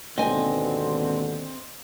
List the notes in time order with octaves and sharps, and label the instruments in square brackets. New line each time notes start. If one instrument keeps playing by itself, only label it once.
[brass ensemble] G#1 D#2 B2 [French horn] D3 [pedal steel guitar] C4 [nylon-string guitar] D#5 G#5